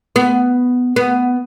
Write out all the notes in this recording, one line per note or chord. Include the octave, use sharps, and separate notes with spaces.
B3
B3